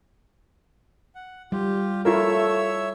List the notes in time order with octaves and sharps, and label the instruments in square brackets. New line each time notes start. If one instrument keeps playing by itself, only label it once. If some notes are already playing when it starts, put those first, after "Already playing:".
[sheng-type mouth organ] F#5
[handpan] G3 [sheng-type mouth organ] F4 G4
[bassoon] A3 [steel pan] E4 F4 A#4 [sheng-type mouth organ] C#5 E5 E6